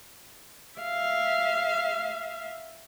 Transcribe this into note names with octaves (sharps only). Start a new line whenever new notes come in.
E5 F5